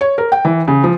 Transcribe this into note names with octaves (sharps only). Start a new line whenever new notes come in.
C#5
A#4
G5
E3
C#3
F3